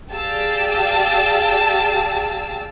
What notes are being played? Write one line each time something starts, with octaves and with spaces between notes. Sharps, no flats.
G4 G#4 D5 F5 A5 E6